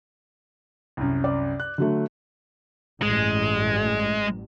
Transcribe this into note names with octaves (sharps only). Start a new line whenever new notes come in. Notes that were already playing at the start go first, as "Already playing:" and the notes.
C2 F#2
D5
F#6
D3 F#3 A3
A1 G2 G#3